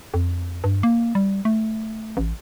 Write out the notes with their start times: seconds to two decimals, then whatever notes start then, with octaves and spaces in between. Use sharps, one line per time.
0.14 F2
0.64 G2
0.83 A#3
1.15 G3
1.45 A3
2.17 A1